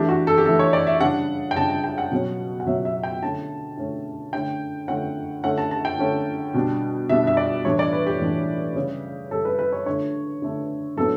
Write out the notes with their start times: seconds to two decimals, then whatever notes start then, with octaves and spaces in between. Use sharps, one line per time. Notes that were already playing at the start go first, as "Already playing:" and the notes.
Already playing: E3 A3 D4 G4
0.08 F#4
0.27 A4
0.38 G4
0.46 E3 A3 D4 A4
0.59 C#5
0.73 D5
0.87 E5
1.01 C#3 G3 D4 F#5
1.51 G5
1.56 C#3 G3 D4 A5
1.70 A5
1.84 G5
1.98 F#5
2.12 B2 F#3 C#4
2.60 F#5
2.67 B2 F#3 C#4 E5
2.85 E5
3.03 G5
3.22 D3 A3 C#4 A5
3.77 D3 A3 C#4
4.33 D3 A3 C#4 G5
4.88 D3 A3 C#4 F#5
5.44 D3 A3 C#4 F#5
5.58 A5
5.71 A5
5.85 G5
5.99 D3 A3 C#4
6.54 B2 G3 D4
7.09 B2 G3 D4 E5
7.27 E5
7.37 D5
7.65 A2 E3 G3 D4 C#5
7.79 D5
7.92 B4
8.07 G4
8.20 A2 E3 G3 D4
8.76 C#3 G3 C#4
9.31 C#3 G3 C#4 A4
9.45 B4
9.59 B4
9.73 C#5
9.86 D3 A3 D4 C#5
10.42 D3 A3 D4
10.97 A2 F#3 B3 D4 A4